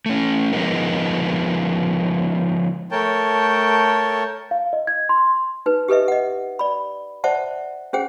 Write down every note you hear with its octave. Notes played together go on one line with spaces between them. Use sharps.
A3 C#4
F3 G#3 B3 D#4 A#4
A3 A#4 C#5 G5 A5
F5
D#5
G#6
C6
D#4 B4
G4 A4 B4 D#5 E5
D#5 F#5
D5 B5
C5 D5 E5 F#5 A5
C#4 G#4 C5 F#5 G5